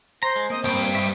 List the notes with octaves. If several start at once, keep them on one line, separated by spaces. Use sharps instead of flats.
C5 A#5 C6
G#3
A#3 C4 D#5
D2 G2 D7
D#5 E5